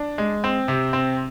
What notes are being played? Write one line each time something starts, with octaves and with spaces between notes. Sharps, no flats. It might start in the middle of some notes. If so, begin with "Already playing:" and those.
Already playing: D4
G#3
C4
C3
C4